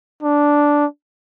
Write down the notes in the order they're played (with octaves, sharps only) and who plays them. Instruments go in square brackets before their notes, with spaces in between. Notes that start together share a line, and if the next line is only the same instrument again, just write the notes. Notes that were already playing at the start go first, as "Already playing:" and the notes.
[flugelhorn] D4